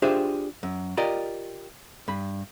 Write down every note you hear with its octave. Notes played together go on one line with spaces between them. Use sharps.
D4 F4 G4 G#4 C5 E5
F#2
F4 G4 A#4 D5 D#5
G2 B5